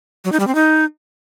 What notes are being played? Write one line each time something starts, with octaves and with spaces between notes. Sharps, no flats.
F#3
D#4
G3
C4
D#4